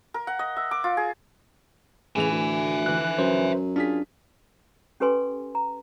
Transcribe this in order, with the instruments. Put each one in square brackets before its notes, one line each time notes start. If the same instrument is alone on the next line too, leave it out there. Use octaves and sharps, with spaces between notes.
[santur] A#4
F#5
D#5
E5
D6
F4
G#4
[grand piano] A2 E3 F7 [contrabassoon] C#3 [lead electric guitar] E5 G#5
[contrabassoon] D2
[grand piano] D3 E3 [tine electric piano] F#6
[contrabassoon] F#2 [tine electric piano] B4 C5
[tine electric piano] D4 [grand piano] F4 G#4 B6
[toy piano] C#4 G4 A4 B4 G#5 C6
A#5